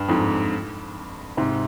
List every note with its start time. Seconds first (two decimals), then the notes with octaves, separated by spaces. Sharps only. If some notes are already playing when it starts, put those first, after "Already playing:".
Already playing: G2
0.09 F2 G#2
1.37 G#2 C3